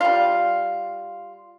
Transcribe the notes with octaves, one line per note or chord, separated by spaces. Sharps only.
G3 F4